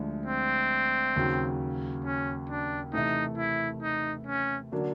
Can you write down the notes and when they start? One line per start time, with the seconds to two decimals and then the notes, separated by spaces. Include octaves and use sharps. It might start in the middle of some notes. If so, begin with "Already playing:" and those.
Already playing: D2 D3 F3 G#3
0.26 C4
1.16 D#2 C#3 F#3
2.05 C#4
2.50 D4
2.93 C3 E3 A3 D#4
3.38 E4
3.83 D#4
4.27 C#4
4.72 D3 F#3 A#3 D4